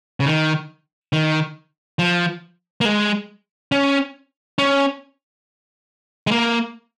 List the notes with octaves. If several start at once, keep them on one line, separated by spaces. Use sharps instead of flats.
C#3
D#3
D#3
F3
A#3
G#3
C#4
C#4
G#3
A#3